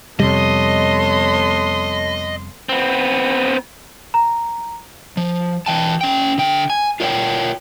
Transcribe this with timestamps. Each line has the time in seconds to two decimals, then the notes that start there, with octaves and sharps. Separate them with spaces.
0.20 F2 C3 G3 B3 A4 C#5 D#5 C6
2.69 B3 C4
4.14 A#5
5.17 F3
5.66 E3 G5 A5
6.01 C#4 G5
6.38 D3 G5
6.70 G#5
7.00 F4 A#4 C#5 F#5 G5